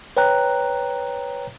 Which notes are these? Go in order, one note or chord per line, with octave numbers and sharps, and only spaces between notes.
B4 C#5 G5 A#5 F#6